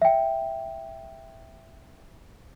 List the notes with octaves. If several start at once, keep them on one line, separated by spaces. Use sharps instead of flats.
E5 G5